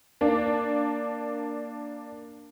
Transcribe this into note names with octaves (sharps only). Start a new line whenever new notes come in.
A#3 D4